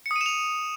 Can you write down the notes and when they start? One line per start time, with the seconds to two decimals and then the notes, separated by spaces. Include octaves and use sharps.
0.06 C#7
0.11 D#6
0.16 D#7
0.21 E7
0.26 F7